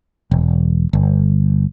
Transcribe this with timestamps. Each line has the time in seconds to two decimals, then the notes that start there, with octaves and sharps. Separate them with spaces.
0.31 E1
0.93 G1